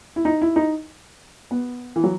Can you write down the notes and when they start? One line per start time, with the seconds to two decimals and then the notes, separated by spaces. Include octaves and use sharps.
0.16 E4
0.25 D#4
0.42 E4
0.56 D#4
1.51 B3
1.96 E3
2.04 F#3